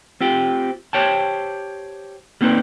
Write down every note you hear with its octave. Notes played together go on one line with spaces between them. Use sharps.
C4 F4 G4
G4 C5 C#5 G5 A5
G3 A#3 C4 D#4 B4 D5